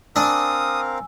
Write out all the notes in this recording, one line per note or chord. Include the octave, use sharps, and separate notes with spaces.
C4 D4 A#4 F5 G#5 D#6 E6